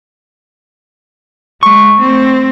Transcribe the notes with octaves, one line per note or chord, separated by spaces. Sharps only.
G#3 C#6
A3 C4